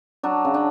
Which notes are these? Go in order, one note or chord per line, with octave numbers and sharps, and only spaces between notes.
F#3 D4
C#3
D4